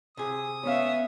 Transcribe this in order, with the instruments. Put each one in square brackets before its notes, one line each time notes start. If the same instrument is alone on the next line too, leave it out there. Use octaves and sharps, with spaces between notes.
[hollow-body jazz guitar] C3 G#4 [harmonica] D#6
[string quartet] B3 C#4 E5 [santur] C#5 F5